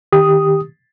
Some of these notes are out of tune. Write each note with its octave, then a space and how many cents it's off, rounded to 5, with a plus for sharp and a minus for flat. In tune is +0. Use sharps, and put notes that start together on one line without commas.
D#3 +0 G4 +10 D#6 +0